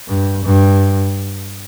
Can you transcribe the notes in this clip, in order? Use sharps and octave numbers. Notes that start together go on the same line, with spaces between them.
G2
G2